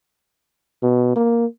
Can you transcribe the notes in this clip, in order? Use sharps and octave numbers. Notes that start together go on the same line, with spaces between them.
B2
A#3